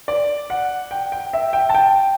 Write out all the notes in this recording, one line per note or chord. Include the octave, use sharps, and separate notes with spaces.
D5
F#5
G5
G5
E5
G5
A5
G5